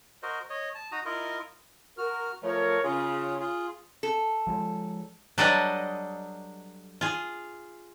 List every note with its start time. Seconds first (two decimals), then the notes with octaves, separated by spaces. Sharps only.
0.23 F#4 A#4 C5 D#5
0.50 C#5 D#5
0.75 A5
0.92 D#4 F#4 A#5 D#6
1.05 E4 F4 A#4 D#5
1.98 F#4 A#4 F6
2.43 F3 A3 A#4 C#5
2.84 C#3 F4 G#4
3.40 F4 G#4
4.03 A4
4.47 F3 G3 G#3
5.38 F#3 G3 D4 A4 B4 D#5
7.01 F4 G#4